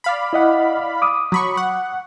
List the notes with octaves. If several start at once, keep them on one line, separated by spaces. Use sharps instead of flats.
D5 F5 B5
E4 D#5 F#5
D6 D#6
F#3 B5 C#6
F#5